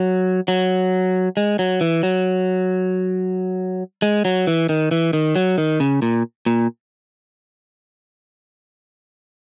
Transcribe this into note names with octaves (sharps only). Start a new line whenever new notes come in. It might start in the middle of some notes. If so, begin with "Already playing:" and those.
Already playing: F#3
F#3
G#3
F#3
E3
F#3
G#3
F#3
E3
D#3
E3
D#3
F#3
D#3
C#3
A#2
A#2